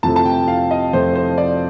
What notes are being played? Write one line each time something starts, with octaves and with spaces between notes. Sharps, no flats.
F2 C3 F3 A3 A5
A5
G5
F5
D#5
F2 C3 F3 A3 C5
C5
D5